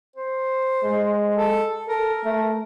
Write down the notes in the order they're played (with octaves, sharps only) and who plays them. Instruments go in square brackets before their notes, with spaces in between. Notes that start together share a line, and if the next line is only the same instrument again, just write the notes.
[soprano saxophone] C5
[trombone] G#3
[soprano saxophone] A4
[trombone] A4 [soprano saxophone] A#4
[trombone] A3